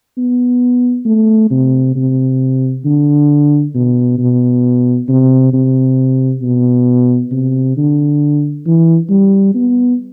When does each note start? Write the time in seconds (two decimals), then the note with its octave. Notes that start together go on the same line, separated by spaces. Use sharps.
0.17 B3
1.05 A3
1.50 C3
1.96 C3
2.85 D3
3.75 B2
4.18 B2
5.08 C3
5.53 C3
6.42 B2
7.31 C3
7.77 D3
8.66 E3
9.10 G3
9.54 B3